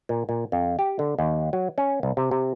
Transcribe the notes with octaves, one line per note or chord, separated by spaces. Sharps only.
A#2
A#2
F2
G4
D3
D#2
F#3
C#4
C2
C3
C3